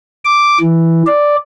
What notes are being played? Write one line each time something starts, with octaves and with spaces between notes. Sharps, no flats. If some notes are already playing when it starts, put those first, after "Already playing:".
D6
E3
D5